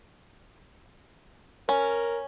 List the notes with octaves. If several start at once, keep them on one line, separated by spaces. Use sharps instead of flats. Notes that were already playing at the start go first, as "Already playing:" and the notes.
C#4 A#4